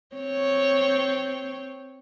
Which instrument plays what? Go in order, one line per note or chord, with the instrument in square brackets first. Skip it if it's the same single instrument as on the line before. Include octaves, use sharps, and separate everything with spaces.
[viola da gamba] C4 C#5